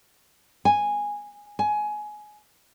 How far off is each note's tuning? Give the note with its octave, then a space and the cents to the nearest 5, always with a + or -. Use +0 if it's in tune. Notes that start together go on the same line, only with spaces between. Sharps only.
G#5 -10
G#5 +20